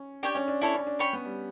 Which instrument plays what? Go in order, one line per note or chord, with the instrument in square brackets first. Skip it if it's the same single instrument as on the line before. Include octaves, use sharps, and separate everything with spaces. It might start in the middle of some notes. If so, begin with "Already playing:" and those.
Already playing: [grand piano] C#4
[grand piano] D4 [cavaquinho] G4 C#5 G5
[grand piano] C#4
D4
[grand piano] C#4 [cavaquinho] E4 A4 C#5
[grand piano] C#4
D4
[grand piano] C#4 [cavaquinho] C#5 G5 B5
[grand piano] B3
G3